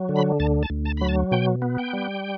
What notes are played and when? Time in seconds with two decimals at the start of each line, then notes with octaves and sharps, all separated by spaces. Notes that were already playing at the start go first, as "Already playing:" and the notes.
Already playing: F#3
0.09 D3
0.16 B5
0.40 D2 A5
0.63 A5
0.70 D2
0.85 A5
0.97 F#3 B5
1.09 A5
1.31 B2 G5
1.62 B3
1.78 G5
1.93 G3